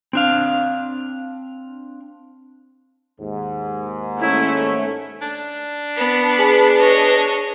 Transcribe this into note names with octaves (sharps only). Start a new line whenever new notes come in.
C4 D4 F5
D#2 G#2
A3 C#4 E4
D4
B3 B5
G#4 B4 G#5 C#7
C#5 D#5